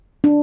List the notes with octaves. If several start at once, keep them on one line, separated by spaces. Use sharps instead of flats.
D4